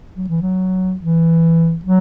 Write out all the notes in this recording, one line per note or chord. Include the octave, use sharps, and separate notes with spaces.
F#3
E3
F#3
E3
F#3